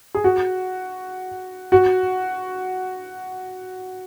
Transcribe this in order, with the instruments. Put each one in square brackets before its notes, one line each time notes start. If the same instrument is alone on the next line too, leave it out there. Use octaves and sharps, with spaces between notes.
[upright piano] G#4
F#4
F#4